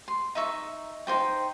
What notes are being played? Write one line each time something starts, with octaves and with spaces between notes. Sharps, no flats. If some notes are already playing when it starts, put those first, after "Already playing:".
C6
D#4 E5 C#6
D#4 F4 C5 G5